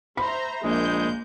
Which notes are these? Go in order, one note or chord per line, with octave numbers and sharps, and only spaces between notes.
C5 E5 A#5 B5
A#1 G#3 A#3 G6